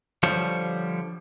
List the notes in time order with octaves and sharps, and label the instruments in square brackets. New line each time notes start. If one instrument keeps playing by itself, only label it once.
[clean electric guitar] D3 F3 G3 C5 C#5